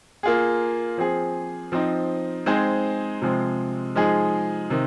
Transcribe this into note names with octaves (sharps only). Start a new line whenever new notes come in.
A#3 F4 G#4
F3 C4 G#4
F3 C4 D#4
G#3 C4 D#4 G#4 C5
C3 F3 G#3 C4
F3 G#3 D#4 G#4
C3 D#3